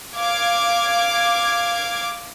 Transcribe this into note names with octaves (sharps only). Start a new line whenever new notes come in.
F5 D6 G#6